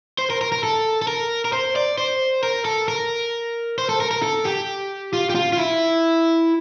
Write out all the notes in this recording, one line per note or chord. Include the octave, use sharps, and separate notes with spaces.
C5
A#4
A#4
A#4
A4
A4
A#4
A#4
C5
D5
C5
A#4
A4
A#4
C5
A4
A#4
A#4
A4
G4
F4
G4
F4
F4
E4